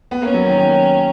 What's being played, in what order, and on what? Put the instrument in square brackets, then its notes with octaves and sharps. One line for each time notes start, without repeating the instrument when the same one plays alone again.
[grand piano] B3
[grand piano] A#3 [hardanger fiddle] C#4
[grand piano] F#3
D#3
D#3